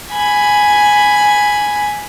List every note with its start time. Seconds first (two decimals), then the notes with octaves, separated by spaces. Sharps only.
0.11 G#5 B5